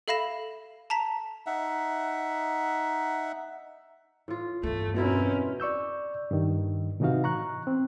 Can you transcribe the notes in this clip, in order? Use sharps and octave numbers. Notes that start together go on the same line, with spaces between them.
A4 E5 F5 B5 A#6 E7
A5 A#5 B6
D#4 E5 F#5
A2 F4
E2 G2 A3
B2 C4 C#4 E4 A#4
D5 C#6 E6 G6
G2 D#3
A2 C3 E3 D#4 F#4 F5
A#5 C#6 F#6
C4